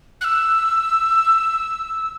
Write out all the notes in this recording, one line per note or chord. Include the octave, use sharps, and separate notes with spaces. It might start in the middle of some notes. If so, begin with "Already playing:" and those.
F#6
E6